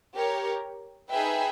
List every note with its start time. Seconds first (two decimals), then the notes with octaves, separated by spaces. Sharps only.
0.15 G4 A#4 C#5
1.11 D#4 G#4 B4 E5 G5